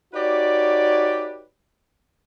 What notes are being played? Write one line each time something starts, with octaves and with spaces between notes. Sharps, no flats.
D#4 F#4 G4 B4 C#5 D5